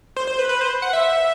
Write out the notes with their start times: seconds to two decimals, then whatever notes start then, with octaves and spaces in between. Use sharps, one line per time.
0.16 C5
0.27 C5
0.39 B4
0.49 B4
0.61 C5
0.82 F#5
0.93 E5